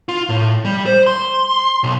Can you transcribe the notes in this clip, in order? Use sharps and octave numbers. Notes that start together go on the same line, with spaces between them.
F4
A2
G3
C5
C6
B1